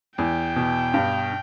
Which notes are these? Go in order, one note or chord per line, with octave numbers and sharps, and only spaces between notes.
E2 G5
B2
G2